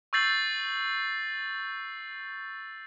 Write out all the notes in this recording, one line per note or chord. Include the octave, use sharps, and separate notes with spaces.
C#6 E6 G6 A6 C7 F#7